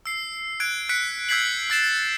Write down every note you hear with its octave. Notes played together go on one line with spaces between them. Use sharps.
E6 C7
F#6 G#6 D7
F#6 B6 C#7 D7
E6 G6 G#6 B6 C7 F#7
E6 A6 C7 E7 F#7